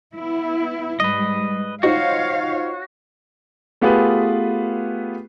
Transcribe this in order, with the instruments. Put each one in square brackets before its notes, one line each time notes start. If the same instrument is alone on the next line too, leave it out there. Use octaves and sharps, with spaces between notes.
[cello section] B3 E4
[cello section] G#2 G3 [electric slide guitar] B4 D#5
[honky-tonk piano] D#4 F4 C5 [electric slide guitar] F#4 [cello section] C#5 F5
[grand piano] A3 B3 F4 G4 G#4 B4